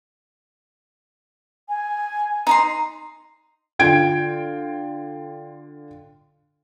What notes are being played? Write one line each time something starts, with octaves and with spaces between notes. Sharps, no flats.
G#5
D#4 A#5 C6
D3 F4 G5 G#6 D7